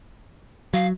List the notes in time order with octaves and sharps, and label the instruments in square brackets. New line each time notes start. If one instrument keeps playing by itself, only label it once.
[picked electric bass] F#3 [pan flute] F5